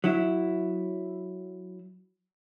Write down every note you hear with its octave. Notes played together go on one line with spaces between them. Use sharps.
F#3 E4